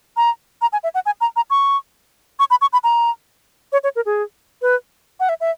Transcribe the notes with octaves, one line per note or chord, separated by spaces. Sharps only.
A#5
A#5
G#5
E5
F#5
G#5
A#5
A#5
C#6
C#6
B5
C#6
B5
A#5
C#5
C#5
A#4
G#4
B4
F#5
E5
E5